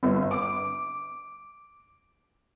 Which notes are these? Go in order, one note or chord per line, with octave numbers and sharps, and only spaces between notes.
G1
D6